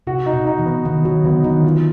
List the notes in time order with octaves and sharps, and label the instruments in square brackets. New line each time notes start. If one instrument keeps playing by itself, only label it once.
[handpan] C3 [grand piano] F#4
[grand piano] D#4
[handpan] B2
[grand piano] D#4
[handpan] E3
[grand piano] B3
[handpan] D#3 [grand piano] B3
[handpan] D#3 [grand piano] F#3
[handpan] D3 [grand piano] B3
[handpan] D#3 [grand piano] D#4
[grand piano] F4